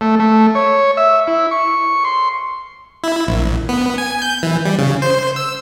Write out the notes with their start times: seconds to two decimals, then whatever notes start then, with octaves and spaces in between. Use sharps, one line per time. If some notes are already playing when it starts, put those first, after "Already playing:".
0.01 A3
0.20 A3
0.55 C#5
0.97 E5
1.27 E4
1.51 C#6
2.05 C6
3.04 E4
3.27 A#1
3.69 B3
3.98 G#5
4.22 G6
4.43 E3
4.65 G3
4.79 C#3
5.02 C5
5.36 E6